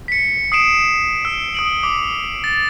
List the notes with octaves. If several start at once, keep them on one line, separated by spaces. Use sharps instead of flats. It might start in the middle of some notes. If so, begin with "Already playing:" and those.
B6 C#7
D#6 C7 D7 E7
E6
D#6 D7 F#7
D6
A6